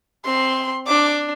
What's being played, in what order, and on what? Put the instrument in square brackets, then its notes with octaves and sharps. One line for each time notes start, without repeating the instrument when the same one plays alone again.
[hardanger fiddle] C4 [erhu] C6
[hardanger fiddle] D4 [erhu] D6